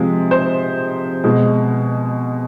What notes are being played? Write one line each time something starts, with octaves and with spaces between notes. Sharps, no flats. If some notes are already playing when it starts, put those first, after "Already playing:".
Already playing: C3 F3 G#3
C5
B2 G#3